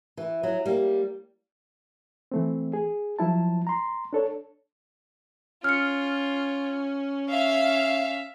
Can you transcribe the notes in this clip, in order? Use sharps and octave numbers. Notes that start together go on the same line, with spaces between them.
E3
F#3
G3 A#3
E3 A3 C4
G#4
F3 F#3 E4 A5
A#5 C6
D4 A4 C#5
C#4 F4 F6 C#7
E5 F5